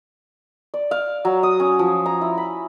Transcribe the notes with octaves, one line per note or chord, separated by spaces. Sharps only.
D5
F5
F#3
D#6
C#4
F3
A#5
E4
B5